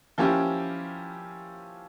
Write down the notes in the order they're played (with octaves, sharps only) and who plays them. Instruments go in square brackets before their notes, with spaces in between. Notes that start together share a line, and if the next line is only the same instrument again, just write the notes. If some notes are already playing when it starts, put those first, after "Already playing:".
[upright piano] F3 A#3 C#4 E4 G4